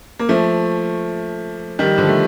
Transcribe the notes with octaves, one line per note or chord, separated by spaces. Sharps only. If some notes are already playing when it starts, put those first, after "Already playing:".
A#3
F3 A3
D#3 G3
D3 F3
A3